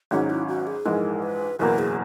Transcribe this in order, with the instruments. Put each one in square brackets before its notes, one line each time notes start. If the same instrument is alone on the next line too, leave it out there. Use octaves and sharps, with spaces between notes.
[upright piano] G#1 G#2 D#3 F#3 C#4 [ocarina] G#4
[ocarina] E4
F#4
G#4
[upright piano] A#1 G#2 E3 G#3 [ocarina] A#4
[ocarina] B4
[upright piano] F#1 E2 B2 A#3 [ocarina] A#4
[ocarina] G#4